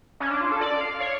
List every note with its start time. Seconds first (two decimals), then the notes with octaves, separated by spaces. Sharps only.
0.20 C#4
0.31 D4
0.41 F4
0.51 A4
0.61 D5
0.81 F5
1.00 C#5